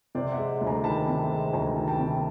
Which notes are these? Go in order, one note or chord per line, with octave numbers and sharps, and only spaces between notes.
C3 C5 D5
E5 F#5
G#3
D2
G#5 A#5
D#3 A5 B5
C3
G#3
D2 G#5 A#5
D#3
G5 A5
C3